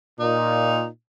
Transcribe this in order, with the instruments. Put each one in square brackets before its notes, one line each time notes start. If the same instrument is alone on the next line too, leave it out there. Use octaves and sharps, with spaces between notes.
[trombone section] A#2 [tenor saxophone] D#4